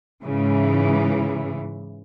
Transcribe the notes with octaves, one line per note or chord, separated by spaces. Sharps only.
G#2 C#3 E3